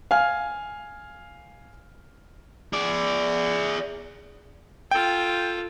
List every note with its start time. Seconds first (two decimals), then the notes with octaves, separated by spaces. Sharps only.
0.11 F5 G#5 F6
2.73 G#4 D5
4.91 F4 A4 G5